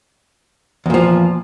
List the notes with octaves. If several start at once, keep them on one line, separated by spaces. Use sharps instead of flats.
E2 A#2 F3